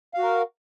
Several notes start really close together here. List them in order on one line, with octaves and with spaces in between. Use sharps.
F5 F#4 A#4